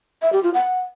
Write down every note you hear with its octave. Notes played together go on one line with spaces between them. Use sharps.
E5
G4
F4
F#5